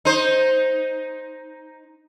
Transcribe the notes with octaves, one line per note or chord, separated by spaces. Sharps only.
D#4 C5